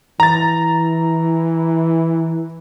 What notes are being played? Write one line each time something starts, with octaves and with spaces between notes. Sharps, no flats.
E3 A#5 A6